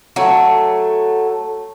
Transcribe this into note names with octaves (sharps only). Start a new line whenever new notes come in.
F#3 A3